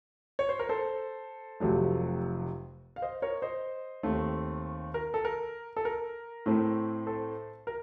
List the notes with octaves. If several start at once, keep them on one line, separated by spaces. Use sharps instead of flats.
C#5
C5
A#4
A4 C5
F1 F2 C3 F#3 A3
F5
C5 D#5
A#4 C#5
C5 D#5
D#2 D#3 A3 C4
A#4
A4
A#4
A4
A#4
A2 A3 C4
A4 C5
A#4